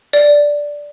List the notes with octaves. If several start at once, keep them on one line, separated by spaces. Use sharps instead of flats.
D5